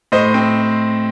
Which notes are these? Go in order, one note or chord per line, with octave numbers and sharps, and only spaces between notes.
A2 C5 D#5
C4